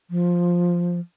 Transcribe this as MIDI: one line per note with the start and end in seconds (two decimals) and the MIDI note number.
0.10 1.00 53